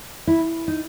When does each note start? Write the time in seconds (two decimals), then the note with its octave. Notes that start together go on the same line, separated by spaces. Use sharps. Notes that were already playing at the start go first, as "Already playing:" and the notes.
0.27 E4
0.68 D#4